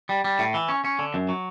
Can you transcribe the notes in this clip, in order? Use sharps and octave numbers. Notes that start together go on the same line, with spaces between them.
G3
G3
A2
E3
C#4
C#4
D3
F#2
F#3